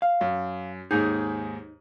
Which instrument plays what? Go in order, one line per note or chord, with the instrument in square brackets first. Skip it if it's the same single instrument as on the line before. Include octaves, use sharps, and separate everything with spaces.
[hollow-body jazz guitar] F5
[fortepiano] F#2
[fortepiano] D#2 G#2 G#4 [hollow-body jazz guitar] D#4